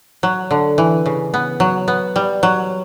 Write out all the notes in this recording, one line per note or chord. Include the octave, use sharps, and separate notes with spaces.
F#3
D3
E3
C#3
B3
F#3
B3
G3
F#3